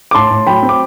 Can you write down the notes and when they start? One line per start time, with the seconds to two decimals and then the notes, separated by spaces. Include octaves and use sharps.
0.11 D6
0.15 A2 A5 C6
0.31 A2
0.47 F#3 G5 B5
0.63 C4
0.69 D6